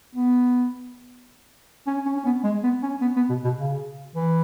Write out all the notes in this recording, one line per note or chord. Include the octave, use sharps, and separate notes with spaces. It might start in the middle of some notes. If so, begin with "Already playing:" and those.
B3
C#4
C#4
C#4
B3
G#3
B3
C#4
B3
B3
B2
B2
C#3
E3